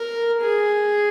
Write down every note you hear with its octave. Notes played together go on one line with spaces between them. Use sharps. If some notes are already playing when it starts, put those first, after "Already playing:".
Already playing: A#4
G#4